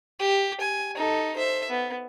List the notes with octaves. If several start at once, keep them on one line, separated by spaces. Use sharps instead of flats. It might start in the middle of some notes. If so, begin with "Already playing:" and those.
G4
G#5
D#4 A4
C5 E5
B3